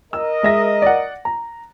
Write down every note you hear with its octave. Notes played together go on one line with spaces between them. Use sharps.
A#4 D#5 E6
G#3 E5 A#6
D5 F#5
A#5